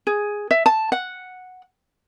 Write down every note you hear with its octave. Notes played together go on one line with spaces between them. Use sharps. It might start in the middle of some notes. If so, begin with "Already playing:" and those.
G#4
E5
A5
F#5